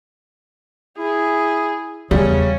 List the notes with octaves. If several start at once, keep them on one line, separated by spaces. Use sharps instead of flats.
E4 G#4
E2 C#3 G3 C#4